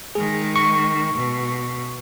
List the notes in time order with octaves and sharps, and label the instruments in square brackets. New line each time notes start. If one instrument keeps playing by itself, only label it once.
[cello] D#3 G#3 [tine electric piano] G#4
[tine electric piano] C#6
[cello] B2